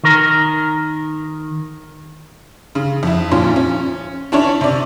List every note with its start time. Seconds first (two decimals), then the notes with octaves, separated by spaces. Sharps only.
0.04 D#3 A#4
2.75 C#3
3.03 F2 E4
3.31 A#2 F3 C#4
3.56 C#4
4.32 C#4 D4 E4 C#5
4.61 C3 D5